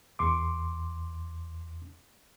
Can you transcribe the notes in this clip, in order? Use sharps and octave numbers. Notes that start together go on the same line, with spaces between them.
E2 C6 D6